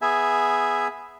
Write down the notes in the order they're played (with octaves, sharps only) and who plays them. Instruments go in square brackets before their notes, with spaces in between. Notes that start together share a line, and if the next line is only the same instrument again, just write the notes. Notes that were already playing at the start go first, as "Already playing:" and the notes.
[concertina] B3 G#4 E5 G#5